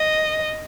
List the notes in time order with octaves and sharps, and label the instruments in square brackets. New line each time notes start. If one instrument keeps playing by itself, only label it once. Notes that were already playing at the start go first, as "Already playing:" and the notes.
Already playing: [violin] D#5